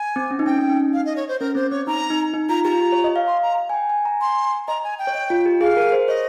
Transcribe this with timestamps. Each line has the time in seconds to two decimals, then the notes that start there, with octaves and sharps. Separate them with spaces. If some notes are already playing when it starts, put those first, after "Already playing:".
Already playing: G#5
0.16 C4
0.31 C#4
0.39 D#4
0.46 C#4 G5
0.59 C#4
0.69 D#4
0.93 F5
1.06 D#5
1.16 C#5
1.28 C5
1.40 C#4 A#4
1.55 C4 C5
1.71 C4 C#5
1.87 D#4 A#5
2.10 D#4
2.34 D#4
2.49 F4 A#5
2.64 G4 A#5
2.73 F4
2.80 G4
2.92 C#5
3.04 D#5
3.16 F5
3.27 C6
3.43 A#5
3.69 G#5
3.74 G5
3.90 G#5
4.05 A#5
4.21 G#5 C6
4.68 D#5 A#5
4.84 G#5
4.99 G5
5.07 C#5
5.15 D#5
5.30 F4
5.46 G4
5.61 G#4 F5
5.77 A#4
5.92 C5
6.08 C#5 D#5